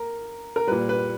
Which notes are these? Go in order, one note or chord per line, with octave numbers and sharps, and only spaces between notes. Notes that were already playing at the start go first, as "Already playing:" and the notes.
Already playing: A#4
A#4
A#2 G3 B4
B4